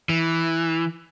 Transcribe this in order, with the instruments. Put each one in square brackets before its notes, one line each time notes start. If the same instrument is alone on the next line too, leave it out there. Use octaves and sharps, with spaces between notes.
[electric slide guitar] E3